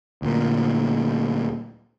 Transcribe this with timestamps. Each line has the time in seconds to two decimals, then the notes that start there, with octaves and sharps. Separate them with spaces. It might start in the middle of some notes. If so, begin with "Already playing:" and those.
0.22 D2 A#2